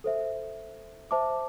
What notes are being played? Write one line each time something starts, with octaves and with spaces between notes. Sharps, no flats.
A4 C5 E5
C5 E5 A5 D6